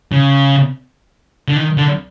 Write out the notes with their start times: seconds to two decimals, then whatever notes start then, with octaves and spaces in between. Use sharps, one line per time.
0.12 C#3
1.48 D3
1.57 D#3
1.77 D3